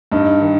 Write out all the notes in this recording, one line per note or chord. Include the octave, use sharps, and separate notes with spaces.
G2 D#4
D#3